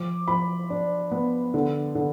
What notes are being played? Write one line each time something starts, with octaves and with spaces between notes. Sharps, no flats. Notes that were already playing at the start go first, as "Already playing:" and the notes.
Already playing: F3 D6
F3 B5
D4
B3
D3
D3